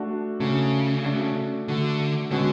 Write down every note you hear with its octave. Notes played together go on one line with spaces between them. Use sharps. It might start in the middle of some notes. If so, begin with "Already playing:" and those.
Already playing: A3 D4 F#4
C#3 A3 D4 F#4
A3 D4 F#4
D3 A3 D4 F#4
B2 D3 G#3 C#4 F#4